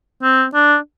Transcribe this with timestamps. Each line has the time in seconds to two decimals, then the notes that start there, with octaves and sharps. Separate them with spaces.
0.23 C4
0.54 D4